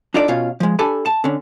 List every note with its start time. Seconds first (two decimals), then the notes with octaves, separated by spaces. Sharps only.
0.14 D4 D#4 F4 A4 D5
0.28 B2 C#4 F4 F5
0.60 F3 G#3
0.79 D4 G4 A4 G#5 B5
1.06 A5
1.24 D3 C#4